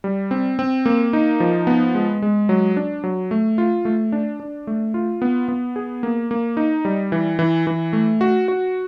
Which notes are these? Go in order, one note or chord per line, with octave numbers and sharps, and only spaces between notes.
G3
C4
C4
A#3
D#4
F3
B3
G#3
G#3
F#3
D4
F#3
A3
F4
A3
D4
D4
A3
F4
B3
B3
G#4
A#3
A#3
D#4
G3
E3
E3
E3
A3
F#4
F#4